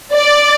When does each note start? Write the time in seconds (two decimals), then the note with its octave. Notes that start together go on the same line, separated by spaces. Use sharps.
0.13 D5